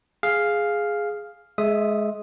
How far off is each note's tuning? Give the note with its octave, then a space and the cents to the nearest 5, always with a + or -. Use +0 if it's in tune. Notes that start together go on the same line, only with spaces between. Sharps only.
G#4 +0 F5 +0
G#3 +20 E5 +0 D#6 +0